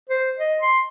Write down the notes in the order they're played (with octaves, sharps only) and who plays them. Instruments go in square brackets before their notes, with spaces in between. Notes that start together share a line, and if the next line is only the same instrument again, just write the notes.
[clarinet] C5
D#5
C6